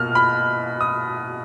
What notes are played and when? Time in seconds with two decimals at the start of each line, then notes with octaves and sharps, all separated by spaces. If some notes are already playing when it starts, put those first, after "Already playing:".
Already playing: B2 A#3 F4 F6
0.15 B5
0.81 D#6